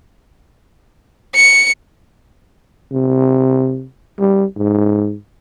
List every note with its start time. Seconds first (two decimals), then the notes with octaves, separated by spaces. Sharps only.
1.36 C#7
2.92 C3
4.19 G3
4.57 G#2